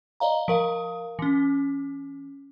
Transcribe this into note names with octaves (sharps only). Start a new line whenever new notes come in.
D5 D#5 F5 A#5
F3 A#4 F5
E3 C#4